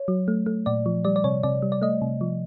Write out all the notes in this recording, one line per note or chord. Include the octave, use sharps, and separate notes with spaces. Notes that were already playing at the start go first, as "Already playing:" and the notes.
Already playing: C#5
F#3
A3
A3
A#2 D5
F3
G3 D5
D5
C3 C#5
C3 D5
G3
D5
A3 D#5
C3
F3